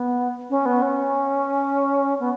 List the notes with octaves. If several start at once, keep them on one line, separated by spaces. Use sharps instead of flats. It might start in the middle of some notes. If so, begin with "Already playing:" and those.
Already playing: B3
C#4
B3
C#4
B3